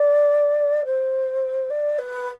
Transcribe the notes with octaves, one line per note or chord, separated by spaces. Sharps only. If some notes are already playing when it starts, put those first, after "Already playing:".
Already playing: D5
C5
D5
B4